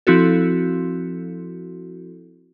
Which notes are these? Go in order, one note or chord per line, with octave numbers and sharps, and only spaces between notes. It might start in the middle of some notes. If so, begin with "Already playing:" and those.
F3 C4 E4 F#4 A4